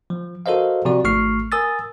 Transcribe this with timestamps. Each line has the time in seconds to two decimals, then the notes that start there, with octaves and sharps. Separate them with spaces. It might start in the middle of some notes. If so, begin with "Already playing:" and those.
0.10 F3
0.46 F#4 A4 A#4 C5 D#5 F5
0.85 C3 F3 F#4 D5
1.04 G#1 A3 C#6 F6 C7
1.52 A#4 G#5 D#6 E6 A6